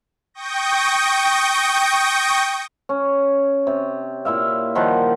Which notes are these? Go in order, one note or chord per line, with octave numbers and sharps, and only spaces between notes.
G5 C#6 D#6 G6 A#6
C#4
C3
A#2 E4 E5 F5
D#3 F3 G3 F#5